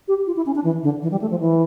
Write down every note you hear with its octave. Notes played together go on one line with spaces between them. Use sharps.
G4
F4
E4
C#4
D4
E3
D3
E3
G3
A3
F3
E3